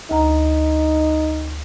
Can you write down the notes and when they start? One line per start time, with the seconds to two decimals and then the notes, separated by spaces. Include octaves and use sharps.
0.11 D2 D#4 A#5